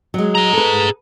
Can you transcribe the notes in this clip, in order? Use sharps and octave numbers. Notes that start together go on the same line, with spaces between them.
F#3 G#3
G#4 A#5
A4 B4